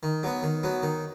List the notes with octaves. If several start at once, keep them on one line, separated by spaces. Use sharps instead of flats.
D#3
F#3 B3
D#3
F#3 B3
D#3